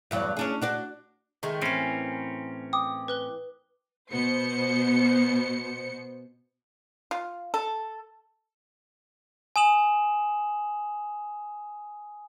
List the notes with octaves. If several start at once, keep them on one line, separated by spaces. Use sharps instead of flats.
E2 G2 F#3
C#4 D4 G#4
D4 F#4 D5
D#3 G#3 A3
A2 E3 C4 C#4 A#4
G5 D6 D#6
B4 F#6 G7
B2 B3 C5 C#7
F4
A4
G#5 D#6 E7 F#7